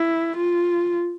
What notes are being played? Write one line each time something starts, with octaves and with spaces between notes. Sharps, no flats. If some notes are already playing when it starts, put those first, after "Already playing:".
Already playing: E4
F4